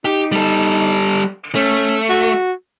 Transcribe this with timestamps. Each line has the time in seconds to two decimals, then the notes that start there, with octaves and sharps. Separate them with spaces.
0.05 D#4 G4
0.32 G3 A4
1.55 A3 C#4
2.09 F#4